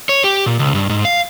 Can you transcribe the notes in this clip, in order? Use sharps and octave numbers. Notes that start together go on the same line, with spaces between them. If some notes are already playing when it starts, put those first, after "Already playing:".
C#5
G4
A#2
C#2
G2
G#2
F5